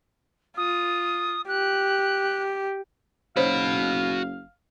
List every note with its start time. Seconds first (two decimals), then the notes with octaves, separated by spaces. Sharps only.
0.57 F4 D#6
1.48 G4 F#6
3.36 F#1 D#4 F#4 C5 C#5 F5 B5